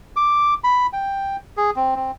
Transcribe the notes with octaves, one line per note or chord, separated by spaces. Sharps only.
D6
B5
G5
G#4
C4
C4